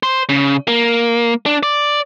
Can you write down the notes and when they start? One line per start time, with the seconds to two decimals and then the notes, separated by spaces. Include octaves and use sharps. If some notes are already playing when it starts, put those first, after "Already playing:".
0.03 C5
0.29 C#3
0.68 A#3
1.46 D4
1.63 D5